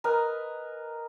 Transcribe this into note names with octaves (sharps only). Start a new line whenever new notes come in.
A#4 B4 D#5 G#5